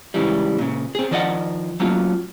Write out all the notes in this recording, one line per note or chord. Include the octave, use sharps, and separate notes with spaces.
G#2 C#3 E3 G3
A#2 C#3
C4 G#4
D#3 F3 D5 D#5 F5 F#5
F#3 A3 A#3 C#4 F4